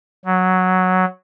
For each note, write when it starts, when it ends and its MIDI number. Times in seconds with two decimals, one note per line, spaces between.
0.25 1.05 54